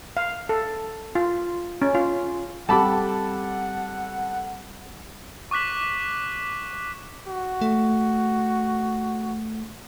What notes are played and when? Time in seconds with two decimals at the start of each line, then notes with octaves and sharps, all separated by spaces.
0.17 F5
0.49 A4
1.15 F4
1.82 C#4
1.95 F4
2.69 G3 C4 G4 A4 F#5 A5 B5 D6
5.51 C#6 D6 F#6 B6 F#7
7.27 F#4
7.61 A3